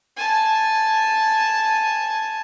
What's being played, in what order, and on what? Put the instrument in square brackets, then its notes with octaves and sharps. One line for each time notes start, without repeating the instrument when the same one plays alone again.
[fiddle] G#5 A5